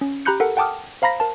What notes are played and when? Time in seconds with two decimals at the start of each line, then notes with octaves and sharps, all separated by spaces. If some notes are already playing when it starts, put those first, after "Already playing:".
0.01 C#4
0.25 G4 A#5 B5 F#6 G6 C#7
0.40 A4 A#4 F#5
0.57 F#5 G5 A5 D6 D#6 F6
1.02 C5 F5 A#5 B5 A#6 B6
1.20 A#4 A5